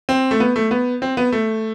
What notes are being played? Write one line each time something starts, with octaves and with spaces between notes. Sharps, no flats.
C4
A3
B3
A3
B3
C4
B3
A3